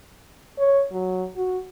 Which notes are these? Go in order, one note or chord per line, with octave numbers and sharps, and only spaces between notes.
C#5
F#3
F#4